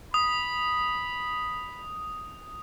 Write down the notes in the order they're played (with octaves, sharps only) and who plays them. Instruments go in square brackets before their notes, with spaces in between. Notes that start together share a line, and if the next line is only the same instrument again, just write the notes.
[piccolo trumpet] B5 [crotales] D#6